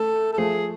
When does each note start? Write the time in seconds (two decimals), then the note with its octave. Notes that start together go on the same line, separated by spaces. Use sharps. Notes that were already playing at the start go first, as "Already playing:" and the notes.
Already playing: A3 A4
0.33 A4
0.38 F3 A3 G#4